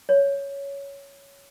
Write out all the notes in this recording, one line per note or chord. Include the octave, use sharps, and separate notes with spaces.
C#5